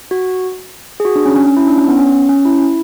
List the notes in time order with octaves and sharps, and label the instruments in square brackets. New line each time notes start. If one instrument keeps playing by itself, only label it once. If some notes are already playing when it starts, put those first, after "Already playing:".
[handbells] F#4
G#4
F#4
D4
C#4
C#4
C#4
E4
D4
C#4
B3
C#4
C#4
E4